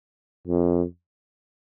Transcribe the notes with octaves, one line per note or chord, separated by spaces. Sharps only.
F2